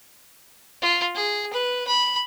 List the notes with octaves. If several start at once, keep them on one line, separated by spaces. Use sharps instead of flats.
F4
G#4
B4
B5